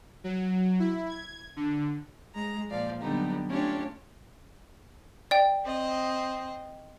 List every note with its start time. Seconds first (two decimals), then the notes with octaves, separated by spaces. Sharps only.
0.24 F#3
0.80 E4
1.09 G#6
1.56 D3
2.33 G#3 A#5
2.70 A#2 F3 D5 F5
3.01 D3 F#3 G3 B3 D#4 G4
3.47 A3 C#4 D4 F4 G4 C#5
5.31 D5 G5
5.64 C4 D#5